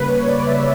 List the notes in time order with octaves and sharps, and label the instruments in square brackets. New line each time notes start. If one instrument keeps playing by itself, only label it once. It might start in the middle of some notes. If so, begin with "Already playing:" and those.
Already playing: [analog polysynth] C#3 G3 A#3 B4
C#5
D5
C#3 G3 A#3 E5